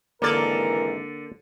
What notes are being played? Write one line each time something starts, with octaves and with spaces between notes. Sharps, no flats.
G#1 D3 E3 A#3 A4 A#4 D5